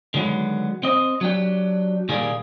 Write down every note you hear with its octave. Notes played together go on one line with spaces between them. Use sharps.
D3 D#3 F#3 G#3 B3
C4 D#5
F#3 D4 G4
A#2 D#3 G3 A#3 G#4